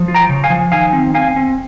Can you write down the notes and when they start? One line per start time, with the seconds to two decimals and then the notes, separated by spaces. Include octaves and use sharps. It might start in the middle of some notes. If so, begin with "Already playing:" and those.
Already playing: F3
0.08 F4
0.15 G5 A#5
0.29 C#3
0.44 F5 G#5
0.50 F3
0.72 D#3 F5 G#5
0.93 C4
1.14 C4 F5 G#5
1.36 C4